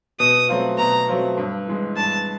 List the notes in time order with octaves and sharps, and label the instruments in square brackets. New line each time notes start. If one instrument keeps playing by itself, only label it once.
[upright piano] B2 [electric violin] D#6
[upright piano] F#3 A3 C4 F4
[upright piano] B2 [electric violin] A#5
[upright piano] F#3 A3 C4 F4
G2
E3 G#3
[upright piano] G2 [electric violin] A5